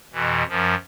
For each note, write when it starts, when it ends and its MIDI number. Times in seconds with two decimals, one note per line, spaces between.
0.13 0.43 41
0.13 0.43 47
0.13 0.43 52
0.49 0.75 42
0.49 0.75 53